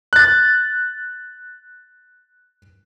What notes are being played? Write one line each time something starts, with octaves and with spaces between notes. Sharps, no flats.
F#6 A6